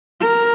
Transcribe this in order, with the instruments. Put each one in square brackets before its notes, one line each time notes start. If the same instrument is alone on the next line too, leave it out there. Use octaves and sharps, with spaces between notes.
[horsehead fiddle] A#4